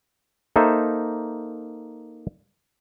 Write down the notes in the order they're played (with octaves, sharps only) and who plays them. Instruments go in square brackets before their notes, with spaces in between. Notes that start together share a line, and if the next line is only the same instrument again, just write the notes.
[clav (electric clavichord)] A#3 D#4 A4 C5 E5